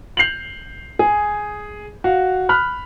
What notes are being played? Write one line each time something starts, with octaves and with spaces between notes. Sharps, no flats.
G6 C7 F7 F#7
G#4
F#4 F5
B5 F6 F#6